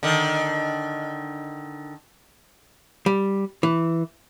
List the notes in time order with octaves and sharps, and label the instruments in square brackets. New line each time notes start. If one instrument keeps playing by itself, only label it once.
[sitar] D3 D#3
[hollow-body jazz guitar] G3
E3